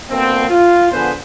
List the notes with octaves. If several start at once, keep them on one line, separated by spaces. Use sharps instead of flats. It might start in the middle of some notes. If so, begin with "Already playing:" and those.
B2 D3 A#3 C4
F4
D3 F3 B3 G#4 B4 C5